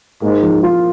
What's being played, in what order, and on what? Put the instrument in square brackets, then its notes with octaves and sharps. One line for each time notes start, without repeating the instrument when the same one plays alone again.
[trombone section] G#2 [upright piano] A#3
[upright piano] F3
F4